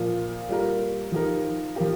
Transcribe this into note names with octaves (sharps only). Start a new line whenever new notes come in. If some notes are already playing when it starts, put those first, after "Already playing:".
Already playing: A#2 F3 A#3 F4
G3 A#3 F4 A#4
F3 D#4 G4 A#4
F3 A#3 G4